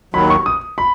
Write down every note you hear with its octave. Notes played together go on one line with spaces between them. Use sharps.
D#2 D#3 F#3 B5
C#6
D#6
B5